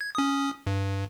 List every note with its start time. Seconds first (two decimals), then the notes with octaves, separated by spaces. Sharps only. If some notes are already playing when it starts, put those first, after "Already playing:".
0.01 G#6
0.15 C#4 D#6
0.67 G2